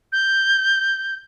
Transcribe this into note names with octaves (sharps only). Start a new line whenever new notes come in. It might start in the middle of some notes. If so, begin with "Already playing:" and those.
G6